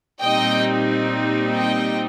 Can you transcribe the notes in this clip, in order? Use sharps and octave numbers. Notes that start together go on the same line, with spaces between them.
A#2 G3 C4 D#4 D#5 G5
D#5 G5